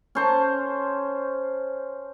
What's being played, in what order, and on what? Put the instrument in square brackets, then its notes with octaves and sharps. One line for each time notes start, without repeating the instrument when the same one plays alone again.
[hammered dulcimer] C#4 C5 A5